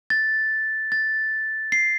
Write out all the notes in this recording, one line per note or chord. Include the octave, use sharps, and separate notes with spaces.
A6
A6
C7